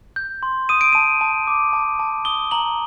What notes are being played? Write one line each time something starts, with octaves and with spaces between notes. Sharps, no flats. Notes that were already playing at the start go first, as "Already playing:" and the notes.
G6
C6
D#6 D#7
D7
A5 D#7
A5
D6
A5
A5
D#6 G7
A#5 F#7